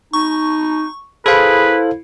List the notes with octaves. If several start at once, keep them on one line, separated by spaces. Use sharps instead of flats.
D#4 C#6
E4 G#4 A4 B4 C5 F5